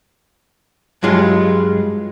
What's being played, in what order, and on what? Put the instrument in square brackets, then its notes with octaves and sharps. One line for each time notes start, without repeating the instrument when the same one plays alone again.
[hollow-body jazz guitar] G2 F#3 G#3 F4